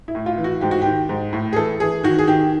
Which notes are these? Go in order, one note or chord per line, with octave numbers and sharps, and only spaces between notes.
E4
A2
F4
E3
F#4
G#2 G4
F#4
D#3 G4
G#2
A2
G#4
E3 A4
E3 G#4
D#3 F#4
G#4
D#3 G4